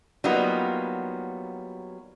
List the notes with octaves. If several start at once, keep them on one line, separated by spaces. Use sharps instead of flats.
F#3 G3 A#3 B3 D#4 F4